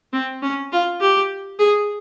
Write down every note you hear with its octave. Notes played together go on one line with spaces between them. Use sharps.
C4
C#4
F4
G4
G#4